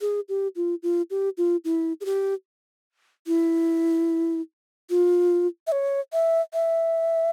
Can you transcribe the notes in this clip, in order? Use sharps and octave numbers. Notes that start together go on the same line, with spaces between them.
G#4
G4
F4
F4
G4
F4
E4
G#4
G4
E4
F4
E5
C#5
E5
E5